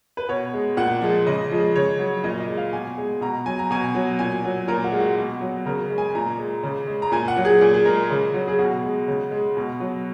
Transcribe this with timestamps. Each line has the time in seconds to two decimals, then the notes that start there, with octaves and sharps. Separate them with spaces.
0.17 B4
0.29 B2 C#5
0.54 G#3
0.77 A#2 F#5
1.01 F3 G#3
1.26 C#3 D#5
1.51 F3 G#3
1.75 C#3 C#5
1.99 F#3
2.24 A#2 D#5
2.40 D#5
2.48 G#3
2.57 F5
2.73 B2 G#5
2.98 G#3
3.21 B2 A#5
3.46 F#3 G#5
3.59 A#5
3.71 B2 G#5
3.95 F#3
4.19 A#2 G#5
4.44 F#3
4.68 A#2 A#4
4.84 F#4
4.92 G#3
5.00 F#4
5.17 B2
5.41 F#3
5.66 C#3 A#4
5.90 G#3
5.98 G#5
6.15 A#2 A#5
6.39 G#3
6.63 C#3
6.88 G#3
7.02 A#5
7.12 A#2 G#5
7.28 F#5
7.36 F#3
7.45 G#4
7.61 A#2 G#4
7.74 G#4
7.85 G#3 A#4
8.11 C#3
8.34 F#3
8.48 G#4
8.59 B2 F#4
8.83 G#3
9.08 C#3
9.31 G#3
9.57 B2
9.80 F#3